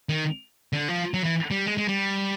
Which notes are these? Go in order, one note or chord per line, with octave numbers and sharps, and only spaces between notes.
D#3
D3
F3
F#3
E3
G3
G#3
G#3
G3